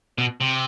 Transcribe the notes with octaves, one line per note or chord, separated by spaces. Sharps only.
B2
C3